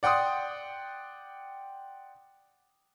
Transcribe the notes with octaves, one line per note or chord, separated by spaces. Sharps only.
D5 F#5 G5 C6 D#6